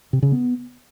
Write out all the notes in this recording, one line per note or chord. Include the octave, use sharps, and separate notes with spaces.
C3
C#3
B3